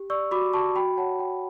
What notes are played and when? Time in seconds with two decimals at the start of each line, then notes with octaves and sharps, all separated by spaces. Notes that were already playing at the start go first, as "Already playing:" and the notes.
Already playing: G4
0.10 D5 C#6 E6
0.31 F#4 B5 D6
0.53 F#4 A5 C#6
0.76 F#4 G5 B5
0.97 C#5 F#5 A5
1.19 F#4 G5